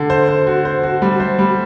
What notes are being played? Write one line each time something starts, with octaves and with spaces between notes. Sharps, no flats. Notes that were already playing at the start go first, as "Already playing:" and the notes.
Already playing: D3
C5
C5
F#4
C5
F#4
G3
C5
G3